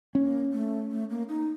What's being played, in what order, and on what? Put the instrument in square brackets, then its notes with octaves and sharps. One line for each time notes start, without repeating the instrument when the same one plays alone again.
[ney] A#3 [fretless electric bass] C#4
[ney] A3
A3
A#3
D#4